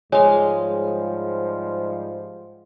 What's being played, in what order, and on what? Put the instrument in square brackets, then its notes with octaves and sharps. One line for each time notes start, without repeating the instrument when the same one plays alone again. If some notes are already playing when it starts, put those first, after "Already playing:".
[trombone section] G#2 F3 G3 [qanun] G#3 F5 [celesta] G#4 C#5